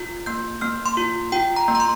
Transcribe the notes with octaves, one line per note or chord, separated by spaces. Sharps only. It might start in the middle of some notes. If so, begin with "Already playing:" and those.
Already playing: F4
A#3 G6
A#3 F6
C6
F4
F4 G5
A#5
A#3
A#5
C6